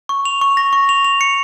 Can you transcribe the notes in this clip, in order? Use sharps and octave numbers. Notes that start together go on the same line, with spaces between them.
C#6
F7
C#6
A#6
C#6
F7
F7
C#7